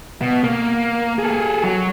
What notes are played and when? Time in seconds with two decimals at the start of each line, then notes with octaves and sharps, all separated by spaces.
0.21 B2
0.44 A#3
1.19 G#4 A4
1.64 F#3